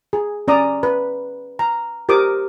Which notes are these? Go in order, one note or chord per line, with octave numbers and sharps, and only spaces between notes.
G#4
C#4 D5 A#5 D#6
B4
A#5
G4 A#4 C5 D6 D#6